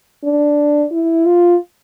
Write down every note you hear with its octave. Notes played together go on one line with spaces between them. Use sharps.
D4
E4
F4